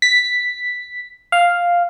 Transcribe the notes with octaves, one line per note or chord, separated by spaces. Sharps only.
B6
F5